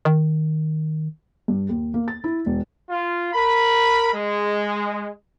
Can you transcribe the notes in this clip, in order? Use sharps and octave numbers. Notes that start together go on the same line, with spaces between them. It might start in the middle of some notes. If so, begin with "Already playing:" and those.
D#3
G2
D#2
A#3
A6
E4
E1
F4
A#4 B5
G#3